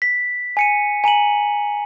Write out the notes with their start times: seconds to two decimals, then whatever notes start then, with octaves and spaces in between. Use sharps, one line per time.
0.02 B6
0.57 G#5 C#7 D#7
1.04 G#5 A#5 D#7 F#7